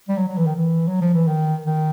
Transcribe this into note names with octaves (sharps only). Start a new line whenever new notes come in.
G3
F#3
F#3
E3
D#3
E3
F#3
F3
E3
D#3
D#3